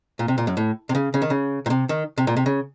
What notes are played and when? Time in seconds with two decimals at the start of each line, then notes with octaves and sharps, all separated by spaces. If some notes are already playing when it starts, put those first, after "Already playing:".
0.19 A#2
0.28 C3
0.38 A#2
0.47 F#2
0.57 A2
0.89 C3
0.95 C#3
1.14 C#3
1.22 D#3
1.30 C#3
1.66 A#2
1.70 C3
1.89 D#3
2.18 C3
2.27 A#2
2.37 C3
2.46 C#3